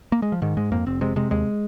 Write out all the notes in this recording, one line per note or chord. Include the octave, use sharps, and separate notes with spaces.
A#3
G#3
F3
G#2 D#3
G#2 G#3
F2 A#3
F1 C4
C3 G#3
C3 G#3
D#2 G#3